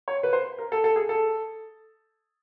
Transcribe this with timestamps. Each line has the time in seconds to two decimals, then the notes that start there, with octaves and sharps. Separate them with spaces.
0.08 C#5
0.23 B4
0.33 C5
0.58 A#4
0.72 A4
0.84 A4
0.96 G#4
1.09 A4